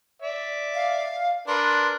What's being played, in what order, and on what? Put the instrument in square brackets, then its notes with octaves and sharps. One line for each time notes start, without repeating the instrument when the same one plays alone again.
[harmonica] D5 E5
[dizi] F5
[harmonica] D4 A#4 B4 [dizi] C6